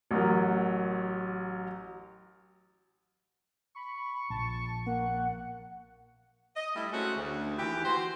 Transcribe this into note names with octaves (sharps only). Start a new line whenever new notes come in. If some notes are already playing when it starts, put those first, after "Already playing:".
A1 F#3 A#4
B5 C#6
A#1 A5
A#3 F#5
D#5
G3 A3 E4
G#3 A3 C4 C#4 F#4
D2
D#2 E3 G4
E3 F#4 C5